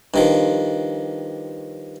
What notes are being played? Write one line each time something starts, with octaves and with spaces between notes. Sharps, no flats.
G2 D#3 F3